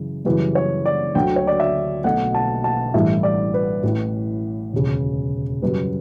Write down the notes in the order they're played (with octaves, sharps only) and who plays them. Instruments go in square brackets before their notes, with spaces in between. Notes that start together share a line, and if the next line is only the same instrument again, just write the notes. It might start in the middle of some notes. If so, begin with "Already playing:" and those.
Already playing: [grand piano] F#2 C#3 E3
F#2 C#3 E3 G3 B4
C#5
D5
D2 D3 F#3 G5
C#5
D5
E5
B1 B2 A3 F#5
A5
A5
A1 G2 E3 A3 E5
D5
B4
A1 A2 E3
E1 D2 C#3
F#2 C#3 G3 B4